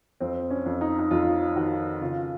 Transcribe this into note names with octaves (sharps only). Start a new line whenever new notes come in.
F2 C4
C#4
F2
D#4
D#4
F2 F4
D#3 F#4
C#3 F4